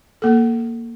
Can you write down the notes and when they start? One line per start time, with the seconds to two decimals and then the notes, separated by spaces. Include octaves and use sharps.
0.22 A#3 A4